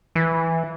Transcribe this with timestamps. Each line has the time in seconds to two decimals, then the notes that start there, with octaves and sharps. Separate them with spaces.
0.15 E3